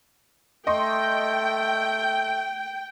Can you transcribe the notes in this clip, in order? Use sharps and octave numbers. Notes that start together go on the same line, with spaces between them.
A3 D#5 G5 C6 C#6